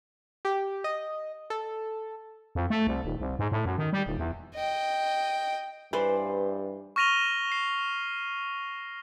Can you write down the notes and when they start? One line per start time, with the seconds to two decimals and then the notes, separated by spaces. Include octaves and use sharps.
0.45 G4
0.84 D#5
1.50 A4
2.55 F2
2.70 A3
2.87 C2
3.04 D#1
3.20 C2
3.39 G#2
3.52 A2
3.66 F#2
3.78 D#3
3.93 G3
4.06 D#1
4.19 E2
4.54 D#5 G5
5.93 G2 E3 B4 C5 D5
6.96 C#6 F6 A#6 D#7 F7 G7
7.52 C7